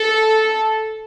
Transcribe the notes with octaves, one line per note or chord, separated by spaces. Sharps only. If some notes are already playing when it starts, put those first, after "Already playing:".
Already playing: A4